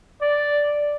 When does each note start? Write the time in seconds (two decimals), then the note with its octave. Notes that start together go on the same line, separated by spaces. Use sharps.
0.22 D5